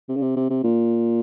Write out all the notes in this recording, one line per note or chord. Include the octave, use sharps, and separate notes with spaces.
C3
C#3
C3
C3
C3
A#2